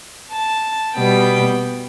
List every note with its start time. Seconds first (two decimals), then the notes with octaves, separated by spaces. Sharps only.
0.31 A5
0.95 B2 G3 B3 G5